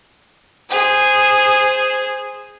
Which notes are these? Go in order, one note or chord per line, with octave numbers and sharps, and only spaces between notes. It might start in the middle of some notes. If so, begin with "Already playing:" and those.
G#4 C5